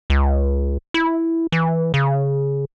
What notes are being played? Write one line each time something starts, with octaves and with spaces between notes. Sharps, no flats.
C#2
E4
E3
C#3